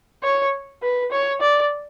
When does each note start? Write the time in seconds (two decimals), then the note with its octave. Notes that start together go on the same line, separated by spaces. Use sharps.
0.23 C#5
0.82 B4
1.11 C#5
1.41 D5